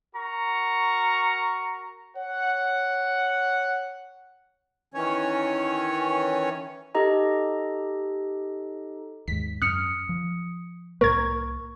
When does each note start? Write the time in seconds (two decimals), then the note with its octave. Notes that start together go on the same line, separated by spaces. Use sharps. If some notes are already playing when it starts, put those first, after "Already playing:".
0.15 F#4 A#4 A#5 C#6
2.15 C#5 F#5
4.94 D#3 E3 C#4 C#5
6.95 D#4 G4 A4 D#5 A#5
9.28 D#2 G#2 B6
9.62 F#2 D#6 F6 C#7
10.09 F3
11.01 C2 A2 A#3 A#4 C#6 G#6